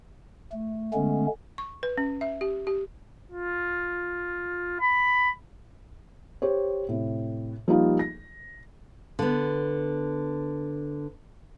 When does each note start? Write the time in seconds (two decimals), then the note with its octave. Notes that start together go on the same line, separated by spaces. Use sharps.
0.52 A3
0.94 D3 G#3 A3 B3 C#4
1.58 C#6
1.83 B4
1.98 C#4
2.21 E5
2.41 G4
2.67 G4
3.31 F4
4.80 B5
6.42 G4 C5 C#5
6.89 A2 C3
7.68 F3 G3 A#3 D#4 F4
7.99 A#6
9.19 D3 B3